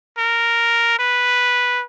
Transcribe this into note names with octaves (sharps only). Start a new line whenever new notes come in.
A#4
B4